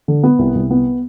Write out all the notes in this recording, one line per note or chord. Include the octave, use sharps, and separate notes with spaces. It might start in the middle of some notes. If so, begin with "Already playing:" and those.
D3
B3
C2
C2
B3